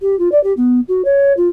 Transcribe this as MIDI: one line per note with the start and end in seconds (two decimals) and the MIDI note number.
0.02 0.18 67
0.19 0.29 65
0.32 0.42 74
0.44 0.53 67
0.57 0.80 59
0.88 1.02 66
1.05 1.33 73
1.37 1.49 65